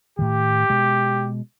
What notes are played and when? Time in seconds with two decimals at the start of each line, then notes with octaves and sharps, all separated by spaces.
0.19 A2 D#3 G4
0.70 B2 G#3